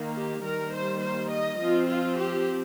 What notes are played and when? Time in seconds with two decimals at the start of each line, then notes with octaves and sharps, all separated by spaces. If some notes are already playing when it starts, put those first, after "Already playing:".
Already playing: D#3 A#3
0.16 G4
0.44 D#3 G3 A#3 A#4
0.74 C5
1.03 C5
1.31 D#5
1.60 F3 C4 F4
1.89 F4
2.17 G4